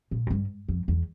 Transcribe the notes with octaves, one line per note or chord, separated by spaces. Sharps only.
A#2
F#2
G2
F2
E2